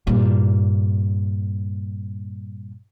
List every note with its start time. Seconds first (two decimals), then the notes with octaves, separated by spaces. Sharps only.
0.07 G2 A#2